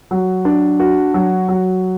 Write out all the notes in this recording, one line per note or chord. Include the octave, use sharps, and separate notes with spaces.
F#3
D4
F#4
F#3
F#3